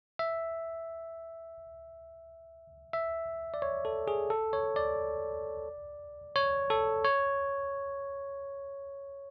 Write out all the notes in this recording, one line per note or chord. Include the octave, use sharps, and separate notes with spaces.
E5
E5
D5
C#5
A4
G#4
A4
C#5
D5
C#5
A4
C#5